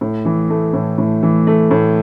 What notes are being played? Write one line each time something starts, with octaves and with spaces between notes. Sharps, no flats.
A2
E3
A3
A2
A2
E3
A3
A2